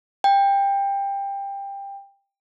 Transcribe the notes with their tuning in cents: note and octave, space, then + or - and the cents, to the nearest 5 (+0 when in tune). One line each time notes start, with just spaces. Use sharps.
G5 +20